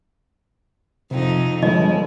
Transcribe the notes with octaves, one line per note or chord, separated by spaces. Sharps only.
F2 C3 D#4
G1 F3 G#3 D#5